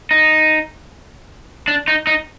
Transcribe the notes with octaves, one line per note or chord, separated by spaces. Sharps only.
D#4
D4
D#4
D#4